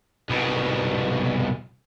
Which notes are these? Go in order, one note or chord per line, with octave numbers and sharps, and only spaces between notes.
C2 B2